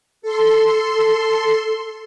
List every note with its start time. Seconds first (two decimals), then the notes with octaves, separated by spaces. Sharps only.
0.22 A4 C6